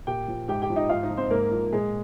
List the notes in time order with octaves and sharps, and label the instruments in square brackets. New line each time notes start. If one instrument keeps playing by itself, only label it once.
[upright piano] A#2 G4 G5
F3
G#2 G4 G5
G4 G5
F3
D#4 D#5
G#2 F4 F5
D#4 D#5
F3
C4 C5
G#2 A#3 A#4
F3
A#2 G#3 G#4